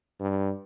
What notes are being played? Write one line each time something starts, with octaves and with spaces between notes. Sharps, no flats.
G2